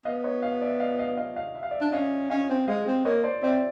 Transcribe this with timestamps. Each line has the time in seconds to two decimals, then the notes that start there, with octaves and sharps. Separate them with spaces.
0.05 B3 D#5 F5
0.24 C#5 D#5
0.42 D#5 F5
0.61 D5 E5
0.80 D#5 F5
0.99 D#5 F5
1.17 D#5 F5
1.36 D#5 F5
1.55 E5
1.63 F5
1.71 D5 E5
1.81 D4
1.92 C#4 D#5 F5
2.30 C#4 D#5 F5
2.49 C4
2.68 G#3 D#5 F5
2.87 C4
3.05 A#3 C#5 D#5
3.24 C5 D5
3.43 C4 D5 E5